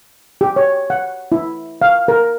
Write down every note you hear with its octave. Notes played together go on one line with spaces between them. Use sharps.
G4
C#5
F#5
E4
F5
A#4